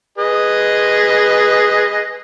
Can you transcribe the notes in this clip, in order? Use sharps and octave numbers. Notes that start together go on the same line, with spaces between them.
G#4 B4 D#5